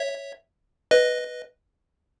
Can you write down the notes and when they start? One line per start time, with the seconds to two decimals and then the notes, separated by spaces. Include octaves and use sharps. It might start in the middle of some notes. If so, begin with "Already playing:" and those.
Already playing: C#5 E5
0.91 B4 D#5